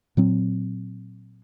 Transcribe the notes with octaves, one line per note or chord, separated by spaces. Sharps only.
A#2 F#3 C4